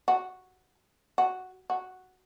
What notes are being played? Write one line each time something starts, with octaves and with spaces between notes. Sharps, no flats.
F#4
F#4
F#4